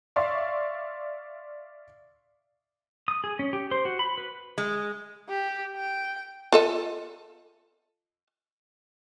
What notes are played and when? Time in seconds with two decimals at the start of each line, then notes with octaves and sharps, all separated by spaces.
0.16 D5 E5 F5 C6 C#6
3.08 D#6
3.24 G#4
3.39 C#4
3.53 G4
3.71 C5
3.85 F#4
3.99 B5
4.18 B4
4.58 G#3
5.29 G4
5.77 G5
6.52 F4 A4 D#5